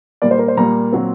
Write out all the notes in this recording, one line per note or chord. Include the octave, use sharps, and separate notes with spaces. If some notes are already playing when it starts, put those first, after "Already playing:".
A#2 G3 A#3 D5
C5
A#4
C5
A#2 G3 A#3 A#5
A#2 F#3 C4